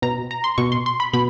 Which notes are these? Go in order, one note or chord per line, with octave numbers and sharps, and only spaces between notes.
B2 A#5
A#5
C6
B2 C#6
C6
C6
B5
B2 B5